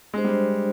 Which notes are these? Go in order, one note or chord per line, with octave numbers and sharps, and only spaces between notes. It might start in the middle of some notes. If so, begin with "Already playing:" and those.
G#3 D4 G4 C5
G3